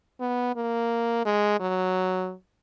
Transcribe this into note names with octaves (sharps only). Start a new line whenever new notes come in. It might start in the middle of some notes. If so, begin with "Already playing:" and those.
B3
A#3
G#3
F#3